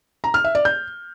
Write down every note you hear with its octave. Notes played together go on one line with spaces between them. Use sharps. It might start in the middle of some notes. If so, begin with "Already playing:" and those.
A#5
F6
E5
D5
G6